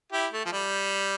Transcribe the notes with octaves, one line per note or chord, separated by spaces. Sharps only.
E4 G4
A3
F3
G3